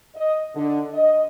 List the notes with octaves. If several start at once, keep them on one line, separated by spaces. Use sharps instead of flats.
D#5
D3
D#5